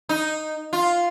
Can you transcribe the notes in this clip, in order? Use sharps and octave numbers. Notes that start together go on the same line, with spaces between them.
D#4
F4